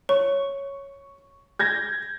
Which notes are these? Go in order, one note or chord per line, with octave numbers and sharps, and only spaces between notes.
C#5 C#6
G6 G#6 A#6